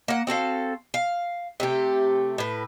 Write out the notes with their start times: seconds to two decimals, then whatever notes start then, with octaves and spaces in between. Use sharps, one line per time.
0.08 A#3 F#5
0.27 C4 F#4 A4 F5
0.94 F5
1.60 C3 A3 G4
2.38 A2 B4